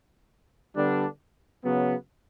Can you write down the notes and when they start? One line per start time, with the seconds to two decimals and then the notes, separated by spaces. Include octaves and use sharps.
0.75 D3 G3 B3 D4
1.63 C#3 F#3 B3